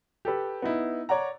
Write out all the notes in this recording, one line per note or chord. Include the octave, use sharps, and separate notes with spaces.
G4 A4 B4
B3 D#4 E4
C#5 D5 F#5 A#5